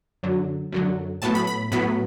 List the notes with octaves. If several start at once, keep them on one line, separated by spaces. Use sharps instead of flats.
F#2 D3 F#3
F#2 D3 F#3
A2 F#3 B3 A5
B5
B5
A2 F#3 B3 B5